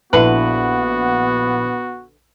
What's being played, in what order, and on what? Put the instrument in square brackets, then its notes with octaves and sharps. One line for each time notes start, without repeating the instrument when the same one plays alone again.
[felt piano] A#1 E4 [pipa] D3 B4 [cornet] B3 [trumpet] F#4